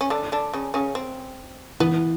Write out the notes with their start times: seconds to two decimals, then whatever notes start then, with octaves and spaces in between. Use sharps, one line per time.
0.01 C#4
0.10 D3 D4
0.32 D3 D4
0.54 C#3 C#4
0.74 C#3 C#4
0.95 C4
1.80 E3 B3